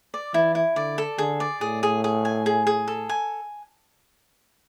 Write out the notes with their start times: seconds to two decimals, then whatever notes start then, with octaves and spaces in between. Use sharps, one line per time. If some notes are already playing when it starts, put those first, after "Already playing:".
0.14 D5
0.34 E3 E4
0.55 E4
0.76 D3 D5
0.98 A4
1.18 D3 G#4
1.40 D5
1.61 A2 G#4
1.83 G#4
2.04 G#4
2.25 G#5
2.46 G#4
2.67 G#4
2.88 A4
3.09 G#5